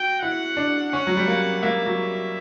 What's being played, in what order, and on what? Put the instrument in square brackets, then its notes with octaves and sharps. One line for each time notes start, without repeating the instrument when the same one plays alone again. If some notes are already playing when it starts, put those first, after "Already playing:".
Already playing: [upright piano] F#4 [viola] G5
[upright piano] E4 [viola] F#5
[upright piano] D4
[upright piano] C#4 [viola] F#5
[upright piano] F#3
G3
A#3
[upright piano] A#3 [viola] E5
[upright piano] F#3